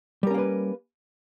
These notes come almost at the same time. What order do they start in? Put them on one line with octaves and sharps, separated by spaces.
G3 A#4 C#4 A#3 B4